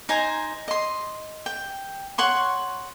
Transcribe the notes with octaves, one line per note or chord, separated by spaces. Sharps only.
D#4 C5 G#5 A#5
D#5 C6
G5
C#5 F#5 C6 C#6